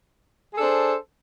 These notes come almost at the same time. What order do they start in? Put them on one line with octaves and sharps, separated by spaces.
G#4 A4 D4 C5